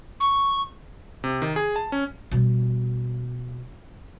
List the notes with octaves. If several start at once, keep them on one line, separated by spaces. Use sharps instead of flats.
C#6
C3
D#3
G#4
A5
C#4
B2 G3